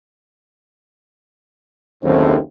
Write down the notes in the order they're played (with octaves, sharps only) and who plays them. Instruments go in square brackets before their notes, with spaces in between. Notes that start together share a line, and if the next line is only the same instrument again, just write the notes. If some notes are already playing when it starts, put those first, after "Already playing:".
[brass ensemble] F#1 D#2 A2 [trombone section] D3 A3 C4